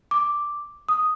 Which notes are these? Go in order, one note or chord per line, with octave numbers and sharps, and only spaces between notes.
D6
D#6